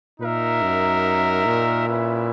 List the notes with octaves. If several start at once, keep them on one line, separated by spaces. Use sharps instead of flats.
A#2 D#4 A#4 E5
F#2
A#2
C#4 E4 B4 E5